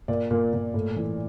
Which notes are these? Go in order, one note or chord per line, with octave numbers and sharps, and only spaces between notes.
A#2 D5
A#2
A#2
A2
E3